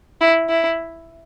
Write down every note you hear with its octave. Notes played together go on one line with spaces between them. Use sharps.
E4
E4